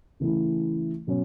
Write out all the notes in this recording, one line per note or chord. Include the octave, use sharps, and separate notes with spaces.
C#3 E3 A3 E4
B2 F#3 C#4